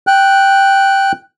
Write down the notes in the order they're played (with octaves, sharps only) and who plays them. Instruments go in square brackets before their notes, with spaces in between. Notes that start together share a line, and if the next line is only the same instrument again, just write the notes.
[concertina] G5 F#6